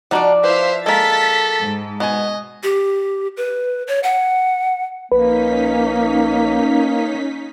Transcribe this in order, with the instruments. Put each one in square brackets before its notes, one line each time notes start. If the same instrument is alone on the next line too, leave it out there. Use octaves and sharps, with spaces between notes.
[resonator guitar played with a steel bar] F3 D5 [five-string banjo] D4 D#4 F#4
[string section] E4 E5 F5 [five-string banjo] B4 [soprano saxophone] C5
[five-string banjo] G#3 A#3 [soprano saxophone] A4 [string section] A6 B6
[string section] G#2
[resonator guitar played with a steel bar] B2 G#5 [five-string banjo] B3 [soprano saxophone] D#5
[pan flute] G4
B4
C#5
F#5
[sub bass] A#1 [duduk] A#3 [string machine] C#4 D#4 B6 [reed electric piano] B4